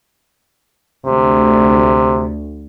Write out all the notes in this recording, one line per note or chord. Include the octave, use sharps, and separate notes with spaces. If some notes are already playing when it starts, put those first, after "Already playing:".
D2 C3